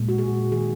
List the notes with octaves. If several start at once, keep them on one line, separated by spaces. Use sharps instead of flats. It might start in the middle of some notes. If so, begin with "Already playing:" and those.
Already playing: A#2 G#3
F#4
G#4
D#3 A#3 G#4